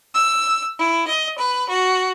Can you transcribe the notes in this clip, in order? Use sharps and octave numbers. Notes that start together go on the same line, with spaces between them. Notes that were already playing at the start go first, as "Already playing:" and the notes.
E6
E4
D#5
B4
F#4